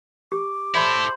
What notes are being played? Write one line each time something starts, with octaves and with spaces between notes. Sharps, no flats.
G4 D6
E4 A4 C5 D5 E5 B5